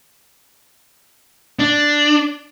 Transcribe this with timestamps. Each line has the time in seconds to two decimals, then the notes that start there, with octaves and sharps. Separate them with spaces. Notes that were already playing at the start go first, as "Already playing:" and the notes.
1.59 D4